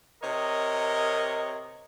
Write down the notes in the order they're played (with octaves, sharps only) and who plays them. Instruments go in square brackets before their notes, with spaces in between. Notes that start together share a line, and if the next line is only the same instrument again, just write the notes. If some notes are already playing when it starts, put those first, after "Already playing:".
[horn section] C3 A#4 C#5 D#5